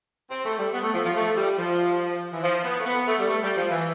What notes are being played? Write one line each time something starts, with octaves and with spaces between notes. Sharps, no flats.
C4
A3
G3
B3
A3
F3
F3
A3
G3
F3
E3
F3
B3
A3
B3
A3
G3
A3
G3
F3
E3